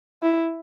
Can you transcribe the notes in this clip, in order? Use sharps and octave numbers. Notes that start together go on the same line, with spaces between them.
E4